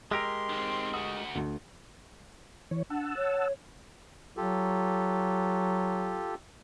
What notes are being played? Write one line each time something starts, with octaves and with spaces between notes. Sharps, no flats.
G#3 G4 A#4 C6 E6 A#6 D7
D#3 C4
A3 F#4 D#6
D2
E3 C#5
D4 F#5 A5 E6
C#5
F#3 F4 G4 A4